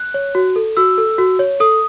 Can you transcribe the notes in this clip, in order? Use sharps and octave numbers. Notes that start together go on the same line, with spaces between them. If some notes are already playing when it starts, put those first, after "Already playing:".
Already playing: F#6
C#5
F#4
A4
F#4 E6
A4
F#4
C#5
A4 D#6